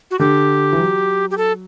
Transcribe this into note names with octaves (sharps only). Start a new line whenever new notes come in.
F#4
D3 G4
E3
F#3
G4
A4